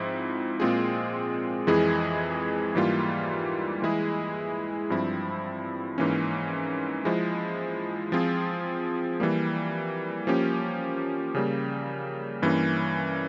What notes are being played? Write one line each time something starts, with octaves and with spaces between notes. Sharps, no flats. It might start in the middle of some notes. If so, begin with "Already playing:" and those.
Already playing: G#2 F3 C4 E4
A#2 G#3 C4 F4 G#4
F2 E3 G#3 E4 G#4
G#2 E3 G3 A#3 F4
E3 G#3 E4 G#4
G2 F3 C4 E4
G#2 E3 A#3 C#4
F3 G#3 E4
F3 C4 F4 G#4
E3 G3 A#3
F3 A#3 C#4 G4
C#3 G3 A#3
G2 E3 A#3 C#4